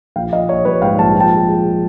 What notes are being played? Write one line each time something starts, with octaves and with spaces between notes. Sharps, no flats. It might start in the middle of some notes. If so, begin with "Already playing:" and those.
A#1 F5 G5
A#1 D#5 F5
A#1 C#5 D#5
G3 B4 C#5
G#2 F5 G5
A#1 A5
F3
G5 A5
G#3
G#3